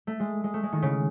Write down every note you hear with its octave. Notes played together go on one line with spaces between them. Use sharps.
A3
G#3
G#3
A3
G#3
D#3
C#3